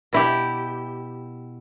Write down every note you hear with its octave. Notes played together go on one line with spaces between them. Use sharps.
B2 E4 G4